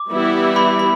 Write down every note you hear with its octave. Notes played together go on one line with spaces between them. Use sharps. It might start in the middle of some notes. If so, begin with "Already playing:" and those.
Already playing: D6
E3 G3 B3 E4 G4
B5
B5